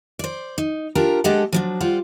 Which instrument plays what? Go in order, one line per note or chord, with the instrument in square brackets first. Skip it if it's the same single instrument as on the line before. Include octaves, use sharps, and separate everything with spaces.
[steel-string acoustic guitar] C5 D5
D#4
D4 F4 G4 A#4 A#5
G#3 D4 G4 A4 D#5 F#5
F3 F#3 D4
G3 F4 C5 F#5